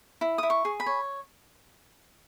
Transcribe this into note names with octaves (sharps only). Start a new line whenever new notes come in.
E4
E4 D#6
C#6
G#4
B5
C#5